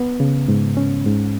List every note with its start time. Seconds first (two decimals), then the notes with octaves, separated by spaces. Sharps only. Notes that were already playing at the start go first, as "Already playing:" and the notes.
Already playing: B3
0.20 C#3
0.48 G#2
0.77 C#4
1.06 G#2